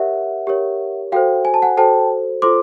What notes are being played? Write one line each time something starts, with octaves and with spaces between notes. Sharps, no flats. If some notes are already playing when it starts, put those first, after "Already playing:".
Already playing: G4 A#4 C#5 E5 F#5
G4 A#4 C#5
F#4 A4 C5 F5 G5
G#5
A5
F#5 G#5
F#4 A4 C5 G5 A5
F4 A4 C5 C6 D6